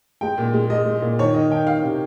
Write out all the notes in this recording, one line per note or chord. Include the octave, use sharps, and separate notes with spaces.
G#3 G5
A#2
G#3
G#3 D#5
G#3
A#2
D#3 C#5
D#3 D#5
D#3 G5
D#3 F5
C3